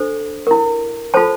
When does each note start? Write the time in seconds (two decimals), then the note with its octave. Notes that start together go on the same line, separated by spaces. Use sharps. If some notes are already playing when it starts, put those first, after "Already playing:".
Already playing: D4 A4 C5
0.47 E4 A#4
1.14 F4 A4 C5 A5